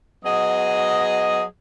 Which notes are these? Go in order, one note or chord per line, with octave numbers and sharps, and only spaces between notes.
F#3 B3 G#4 D#5